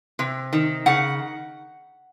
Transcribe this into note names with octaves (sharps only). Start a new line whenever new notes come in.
C3
D#3
C#3 F#5